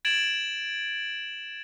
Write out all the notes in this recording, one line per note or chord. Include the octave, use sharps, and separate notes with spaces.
G#6 A6 D7 E7 F#7